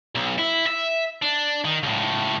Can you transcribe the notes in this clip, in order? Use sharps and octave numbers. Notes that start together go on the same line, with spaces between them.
B1
E4
E5
D4
D#3
C#2 A2